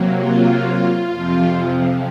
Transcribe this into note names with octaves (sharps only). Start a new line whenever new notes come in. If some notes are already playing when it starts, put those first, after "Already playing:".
Already playing: C3 F#3 A#3
F4
F2 C3 F3